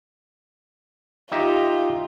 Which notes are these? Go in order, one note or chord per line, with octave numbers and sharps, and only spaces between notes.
D#4 F4 G4 E5